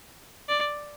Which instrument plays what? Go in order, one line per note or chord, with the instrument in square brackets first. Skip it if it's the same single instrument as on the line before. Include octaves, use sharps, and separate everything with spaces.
[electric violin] D5